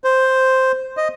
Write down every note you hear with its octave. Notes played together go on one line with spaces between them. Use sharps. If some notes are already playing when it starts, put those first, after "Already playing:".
C5
D#5